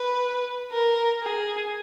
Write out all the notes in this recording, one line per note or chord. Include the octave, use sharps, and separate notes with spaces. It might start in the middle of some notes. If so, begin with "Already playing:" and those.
Already playing: B4
A#4
G#4